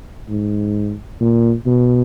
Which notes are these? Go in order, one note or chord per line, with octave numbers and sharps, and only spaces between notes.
G#2
A#2
B2